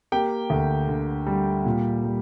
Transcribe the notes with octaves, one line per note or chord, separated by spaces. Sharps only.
A#3 G4 G5
D2
D3
G3
A#2
G3